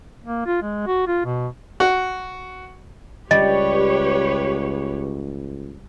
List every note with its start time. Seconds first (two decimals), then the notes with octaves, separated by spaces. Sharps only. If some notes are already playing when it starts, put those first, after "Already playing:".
0.24 A#3
0.46 F4
0.62 G#3
0.87 F#4
1.07 F4
1.26 B2
1.80 F#4
3.31 C#2 G3 G4 B4 C#5 D#5